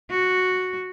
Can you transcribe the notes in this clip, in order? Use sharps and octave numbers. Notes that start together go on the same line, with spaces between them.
F#4